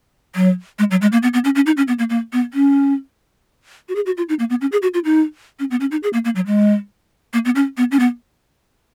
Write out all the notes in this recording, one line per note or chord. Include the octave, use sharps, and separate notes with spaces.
F#3
G#3
F#3
G#3
A#3
B3
B3
C#4
C#4
D#4
C#4
B3
A#3
A#3
B3
C#4
F#4
G#4
F#4
F4
D#4
A#3
B3
C#4
G#4
F#4
F4
D#4
C#4
B3
C#4
D#4
G#4
A#3
A#3
F#3
G#3
A#3
B3
C#4
B3
C#4
B3